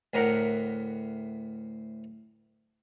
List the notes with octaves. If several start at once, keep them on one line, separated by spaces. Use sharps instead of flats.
D2 A2 A#4 F#5